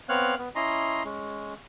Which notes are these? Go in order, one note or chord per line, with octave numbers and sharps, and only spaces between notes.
B3 C4 C#5 F5 F#6
B3
C#4 E4 D#5 A#5 C6
G#3 C#4